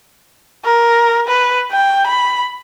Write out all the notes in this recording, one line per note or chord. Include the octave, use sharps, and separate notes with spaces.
A#4
B4
G5
B5